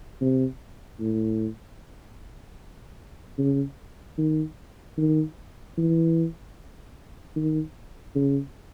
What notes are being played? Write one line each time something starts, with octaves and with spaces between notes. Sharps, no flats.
C3
A2
C#3
D#3
D#3
E3
D#3
C#3